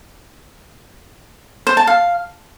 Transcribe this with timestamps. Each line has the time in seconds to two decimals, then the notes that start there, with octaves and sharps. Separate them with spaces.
1.67 C5
1.77 A5
1.87 F5